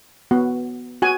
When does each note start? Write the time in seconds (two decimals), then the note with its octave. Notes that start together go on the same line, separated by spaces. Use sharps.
0.31 B3 F#4
1.02 F#4 G#5